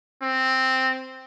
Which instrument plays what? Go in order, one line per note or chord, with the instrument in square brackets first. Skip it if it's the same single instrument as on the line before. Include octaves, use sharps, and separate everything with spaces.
[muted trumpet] C4